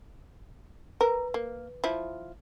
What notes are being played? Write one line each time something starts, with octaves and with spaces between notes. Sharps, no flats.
A#4 B4
A#3
F3 E4